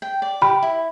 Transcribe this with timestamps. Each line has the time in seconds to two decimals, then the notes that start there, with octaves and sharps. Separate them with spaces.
0.02 G5
0.22 D5
0.41 G4 B5
0.62 E4